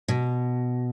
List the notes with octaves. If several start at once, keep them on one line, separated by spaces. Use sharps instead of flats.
B2